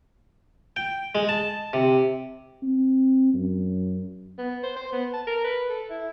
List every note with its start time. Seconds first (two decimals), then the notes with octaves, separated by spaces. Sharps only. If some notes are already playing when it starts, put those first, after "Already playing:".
0.76 G5
1.15 G#3
1.29 A5
1.73 C3
2.63 C4
3.34 F#2
4.38 B3
4.63 C5
4.76 C5
4.92 B3
5.13 A5
5.27 A#4
5.44 B4
5.69 A4
5.90 E4